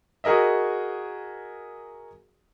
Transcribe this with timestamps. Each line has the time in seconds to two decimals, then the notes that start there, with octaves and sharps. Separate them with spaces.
0.24 F#4 G#4 A#4 D#5 E5